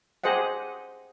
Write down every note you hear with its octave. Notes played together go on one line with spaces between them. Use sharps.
G4 G#4 C5 D#5 F#5